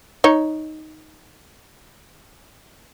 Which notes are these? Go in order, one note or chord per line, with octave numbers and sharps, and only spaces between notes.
D#4 C#5